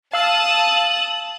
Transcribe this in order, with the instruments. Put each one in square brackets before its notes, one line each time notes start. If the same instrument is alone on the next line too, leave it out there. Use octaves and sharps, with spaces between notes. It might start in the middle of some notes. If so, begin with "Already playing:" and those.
[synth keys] F5 E6 [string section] A5 D#6 [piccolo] F#7